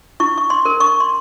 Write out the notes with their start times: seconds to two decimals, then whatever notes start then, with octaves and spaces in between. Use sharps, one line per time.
0.20 E4 C#6
0.38 C#6
0.50 C6
0.65 A#4
0.80 C#6
1.00 C6